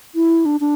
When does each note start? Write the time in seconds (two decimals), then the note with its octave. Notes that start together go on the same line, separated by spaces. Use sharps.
0.15 E4
0.45 D4
0.60 D4